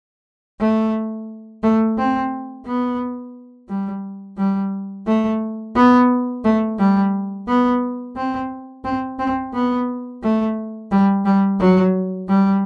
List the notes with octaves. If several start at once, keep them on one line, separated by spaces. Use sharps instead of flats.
A3
A3
C4
B3
G3
G3
A3
B3
A3
G3
B3
C4
C4
C4
B3
A3
G3
G3
F#3
G3